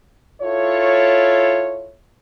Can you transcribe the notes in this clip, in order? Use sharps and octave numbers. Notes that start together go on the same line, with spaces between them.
E4 F4 A4 C#5